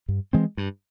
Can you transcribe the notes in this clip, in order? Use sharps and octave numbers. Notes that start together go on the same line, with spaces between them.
G2
E3 G#3 C4
G2